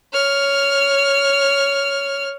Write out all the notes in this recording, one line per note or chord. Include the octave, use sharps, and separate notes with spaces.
C#5 F6